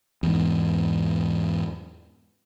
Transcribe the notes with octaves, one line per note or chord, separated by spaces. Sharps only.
E2 G#2